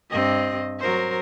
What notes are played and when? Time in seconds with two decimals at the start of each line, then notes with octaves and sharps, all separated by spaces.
0.10 G2 C4 D#5
0.80 F#3 A#4 C5